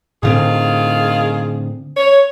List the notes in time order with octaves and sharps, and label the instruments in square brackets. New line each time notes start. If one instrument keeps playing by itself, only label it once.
[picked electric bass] A2 D3 C4 [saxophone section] D#3 F4 G#4
[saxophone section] C#5